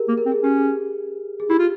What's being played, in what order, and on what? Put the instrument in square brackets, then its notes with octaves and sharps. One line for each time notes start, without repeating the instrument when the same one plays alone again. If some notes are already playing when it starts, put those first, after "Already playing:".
Already playing: [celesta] G4 G#4 A#4
[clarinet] A#3
[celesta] A#4
[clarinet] C4
[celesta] G#4
[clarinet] C#4 [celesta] G4
[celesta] G#4
G#4
[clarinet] E4 [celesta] G4
[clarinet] F4